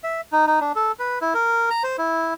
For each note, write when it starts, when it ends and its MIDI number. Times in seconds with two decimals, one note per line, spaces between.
0.04 0.21 76
0.32 0.47 63
0.47 0.60 63
0.61 0.72 62
0.76 0.92 69
0.99 1.19 71
1.21 1.34 64
1.34 1.70 70
1.71 1.83 82
1.84 1.97 72
1.98 2.34 64